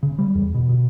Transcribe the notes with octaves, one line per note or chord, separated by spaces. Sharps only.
C#3
G3
E2
B2
B2